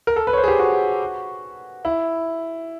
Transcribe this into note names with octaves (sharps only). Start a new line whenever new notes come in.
A#4
A4
B4
C#5
C5
G#4
G4
F#4
E4